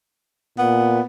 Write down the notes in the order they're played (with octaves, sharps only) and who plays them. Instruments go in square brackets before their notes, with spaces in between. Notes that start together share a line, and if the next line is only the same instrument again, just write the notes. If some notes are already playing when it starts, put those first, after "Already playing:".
[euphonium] A#2 [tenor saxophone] B3